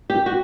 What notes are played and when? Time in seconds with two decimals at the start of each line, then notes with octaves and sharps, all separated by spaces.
0.10 G4
0.26 F#4